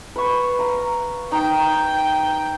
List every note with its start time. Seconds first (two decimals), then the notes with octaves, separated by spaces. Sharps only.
0.16 B4 C#6
0.59 F5 A#5
1.32 D#4 G5